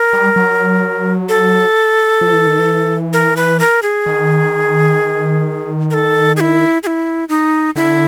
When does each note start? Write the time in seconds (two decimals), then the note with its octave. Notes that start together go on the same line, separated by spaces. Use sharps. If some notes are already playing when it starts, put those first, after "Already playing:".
Already playing: A#4
0.13 G3
0.36 F#3
1.29 A4
2.21 F3
2.33 E3
2.47 D#3
2.59 E3
3.13 A#4
3.37 B4
3.60 A#4
3.82 G#4
4.06 D#3
5.91 A#4
5.94 A4
6.37 G#4
6.40 E4
6.83 G#4
6.87 E4
7.29 D#4
7.76 D3 E4